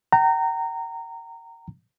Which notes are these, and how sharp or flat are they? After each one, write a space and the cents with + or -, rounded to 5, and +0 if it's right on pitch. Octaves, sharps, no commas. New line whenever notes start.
G5 -40 A#5 -20